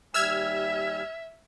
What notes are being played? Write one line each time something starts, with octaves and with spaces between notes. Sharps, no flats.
D#2 G3 E5 G#5 E6 F6 G#6